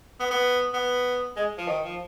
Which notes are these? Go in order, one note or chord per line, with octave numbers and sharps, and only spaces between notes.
B3
B3
B3
G#3
F3
D#3
F3